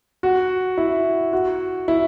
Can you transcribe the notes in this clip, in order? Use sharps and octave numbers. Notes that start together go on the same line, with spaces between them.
F#4
E4
F#4
E4